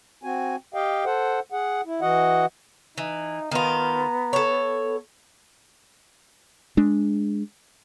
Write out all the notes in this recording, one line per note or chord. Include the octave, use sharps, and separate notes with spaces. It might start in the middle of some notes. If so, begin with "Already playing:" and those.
C4 F#4 G#5
G4 D#5 F5 G5
A4 C5 F#5
G#4 F#5
E4
E3 F#4 D#5 F#5
E3 D#4
D#3 B3 F4 A#5
A4 C#5
G#3 D4